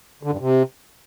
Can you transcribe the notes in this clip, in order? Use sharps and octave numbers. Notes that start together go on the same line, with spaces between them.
D3
G2
C3